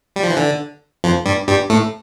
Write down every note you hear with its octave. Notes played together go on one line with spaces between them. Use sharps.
G3
F3
E3
D3
F2 F3
G2 G3
G2 G3
A2 A3